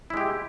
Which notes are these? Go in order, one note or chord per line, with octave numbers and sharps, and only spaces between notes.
G#3 E4 G4